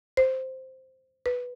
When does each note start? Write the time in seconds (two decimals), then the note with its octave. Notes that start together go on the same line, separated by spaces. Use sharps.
0.17 C5
1.26 B4